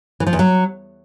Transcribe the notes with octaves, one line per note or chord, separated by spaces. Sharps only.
E3
F3
E2
F#3